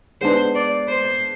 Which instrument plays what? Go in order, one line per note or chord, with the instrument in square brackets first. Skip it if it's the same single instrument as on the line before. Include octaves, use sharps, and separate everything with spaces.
[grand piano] G#3 B3 D4 [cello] C5
[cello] D5
C5